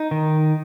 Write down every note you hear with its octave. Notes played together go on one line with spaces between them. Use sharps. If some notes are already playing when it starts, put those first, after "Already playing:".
Already playing: D#4
D#3